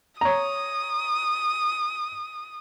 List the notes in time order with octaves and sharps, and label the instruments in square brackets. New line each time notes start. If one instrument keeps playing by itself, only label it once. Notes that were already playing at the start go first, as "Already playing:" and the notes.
[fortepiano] C#5 A#5 [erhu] D#6